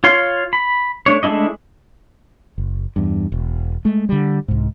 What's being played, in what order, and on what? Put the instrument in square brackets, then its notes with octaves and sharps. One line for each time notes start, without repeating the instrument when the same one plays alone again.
[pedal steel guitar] F4 C#5 F5 C6
B5
A3 D4 C#5
G#3 A3 D4 E4 D#5
[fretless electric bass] F#1
E2 G2
E1
G#3 A3
D3 G3
C2 G#2